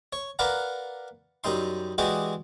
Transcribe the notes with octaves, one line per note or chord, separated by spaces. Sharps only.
C#5
A#4 B4 D5 F5 F#5 A#5
F#2 G3 D#4 C6
E3 G#3 F#4 G4 D5 D#5